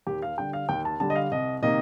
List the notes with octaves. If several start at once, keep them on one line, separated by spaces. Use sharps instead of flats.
D#2 G4
F5
D3 G3 G5
F5
D#2 G5
A5
D3 G3 A5
D#5
F5
C2 D#5
C3 D#3 A#3 D#5